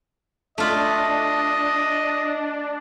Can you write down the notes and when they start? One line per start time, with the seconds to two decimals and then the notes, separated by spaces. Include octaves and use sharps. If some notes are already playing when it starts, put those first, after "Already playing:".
0.58 A3 D4 F4 D#5 B5